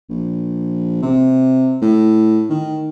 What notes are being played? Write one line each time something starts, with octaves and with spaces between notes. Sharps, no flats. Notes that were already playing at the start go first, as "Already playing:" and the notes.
A#1
C3
A2
D#3